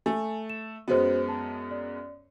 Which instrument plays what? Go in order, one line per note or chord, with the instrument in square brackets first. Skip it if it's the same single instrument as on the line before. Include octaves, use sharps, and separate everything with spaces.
[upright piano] A3 [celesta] G#5
[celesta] E7
[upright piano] F#2 G#3 B3 [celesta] F#4 C5
[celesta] A5
D5